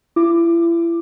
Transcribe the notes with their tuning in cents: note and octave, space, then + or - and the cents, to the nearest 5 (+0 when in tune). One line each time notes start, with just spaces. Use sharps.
E4 +35 D6 +10